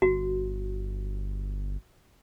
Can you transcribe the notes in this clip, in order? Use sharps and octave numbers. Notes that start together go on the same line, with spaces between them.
G1 F#4